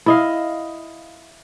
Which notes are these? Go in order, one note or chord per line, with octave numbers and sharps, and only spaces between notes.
E4 D#5 F5